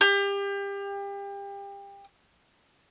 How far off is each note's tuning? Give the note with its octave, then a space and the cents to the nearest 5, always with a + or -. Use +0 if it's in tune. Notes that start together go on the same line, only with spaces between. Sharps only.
G4 +30